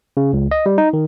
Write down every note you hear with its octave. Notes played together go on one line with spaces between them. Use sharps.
C#3
C#2
D#5
G3
D#4
D#3